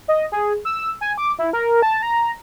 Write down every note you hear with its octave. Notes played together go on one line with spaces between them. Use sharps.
D#5
G#4
E6
G#5
D6
E4
A#4
A5
A#5